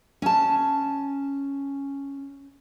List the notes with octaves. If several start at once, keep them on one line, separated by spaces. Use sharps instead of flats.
C#4 A5